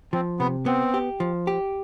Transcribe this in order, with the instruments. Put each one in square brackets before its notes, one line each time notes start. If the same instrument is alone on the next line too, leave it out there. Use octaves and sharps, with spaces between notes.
[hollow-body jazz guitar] F3 [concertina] C4
[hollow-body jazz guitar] C3 [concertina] B3
[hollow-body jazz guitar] B3 [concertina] C4
[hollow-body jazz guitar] G4
F3
G4